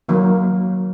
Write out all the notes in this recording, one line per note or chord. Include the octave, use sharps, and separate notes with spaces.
D#3 F#3 A#3